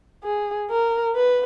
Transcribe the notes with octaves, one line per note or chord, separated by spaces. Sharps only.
G#4
A#4
B4